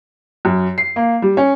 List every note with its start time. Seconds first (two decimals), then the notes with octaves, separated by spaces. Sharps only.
0.45 F#2
0.78 C7
0.96 A#3
1.22 G3
1.37 C#4